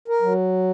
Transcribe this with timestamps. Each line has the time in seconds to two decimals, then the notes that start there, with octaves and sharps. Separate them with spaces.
0.08 A#4
0.22 F#3